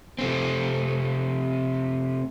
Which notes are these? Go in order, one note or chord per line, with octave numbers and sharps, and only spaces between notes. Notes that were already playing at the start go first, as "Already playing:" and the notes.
C3 A3 C4